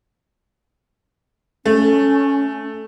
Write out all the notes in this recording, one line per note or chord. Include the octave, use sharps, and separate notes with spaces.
A3 C#4